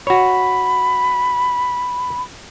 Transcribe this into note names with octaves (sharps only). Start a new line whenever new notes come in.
F#4 C#5 B5